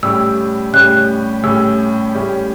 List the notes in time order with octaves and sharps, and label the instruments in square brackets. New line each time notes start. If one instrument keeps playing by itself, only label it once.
[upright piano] A2 G3 C#4 G4 [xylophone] E6
[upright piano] A2 G3 C#4 G4 [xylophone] F#6
[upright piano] A2 G3 C#4 G4 [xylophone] E6
[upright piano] A2 G3 C#4 G4